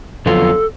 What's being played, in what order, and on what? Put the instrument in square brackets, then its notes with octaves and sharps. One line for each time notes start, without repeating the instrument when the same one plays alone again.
[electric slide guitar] F2 D3 F#3 B3 F4 [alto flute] A4